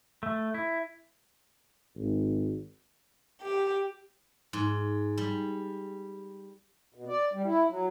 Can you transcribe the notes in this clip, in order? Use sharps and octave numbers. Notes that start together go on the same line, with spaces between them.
A3
E4
G#1
G4
G#2
G3
B2
D5
G3
E4
F#3